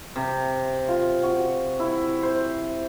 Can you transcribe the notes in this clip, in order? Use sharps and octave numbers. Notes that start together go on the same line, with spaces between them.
C3
F4
F#4
E4
C5